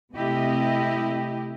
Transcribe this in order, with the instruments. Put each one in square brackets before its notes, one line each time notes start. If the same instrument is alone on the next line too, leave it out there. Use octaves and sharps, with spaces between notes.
[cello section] C3 A3 E4 G4 D#5